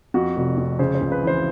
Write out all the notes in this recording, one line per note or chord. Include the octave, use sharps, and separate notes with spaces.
F2 F#4
F1
F2
C#3 C5
C5
C#2
B4
E3 C5